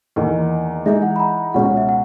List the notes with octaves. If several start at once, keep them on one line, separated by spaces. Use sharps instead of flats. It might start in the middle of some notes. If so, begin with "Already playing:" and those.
E2 D#3 A#3 D#4 D#5
E3 G#3 D#4 G#4 E5
F#5
B5
A#5
C#2 B2 G#3 C#4 F#5
F#5
E5
F#5